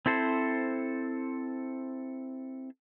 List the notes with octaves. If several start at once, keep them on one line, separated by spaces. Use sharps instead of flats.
C4 E4 A4 C5